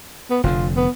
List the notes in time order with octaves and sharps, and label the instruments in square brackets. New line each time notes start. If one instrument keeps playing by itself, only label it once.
[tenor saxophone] B3
[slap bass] F1 F2 D3 [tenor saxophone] F4
[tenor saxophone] B3